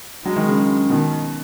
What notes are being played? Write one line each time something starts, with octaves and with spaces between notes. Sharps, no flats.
F#3 G#3
D#3
C#3
B2 D#3